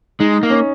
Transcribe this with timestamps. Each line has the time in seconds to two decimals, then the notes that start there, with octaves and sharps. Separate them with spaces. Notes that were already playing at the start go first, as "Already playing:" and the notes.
0.20 G#3 D#4
0.43 A#3
0.50 C#4